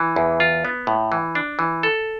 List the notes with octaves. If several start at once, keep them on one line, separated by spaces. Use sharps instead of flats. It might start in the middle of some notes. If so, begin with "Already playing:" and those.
Already playing: E3
E2
F4
B3
A2
E3
D4
E3
A4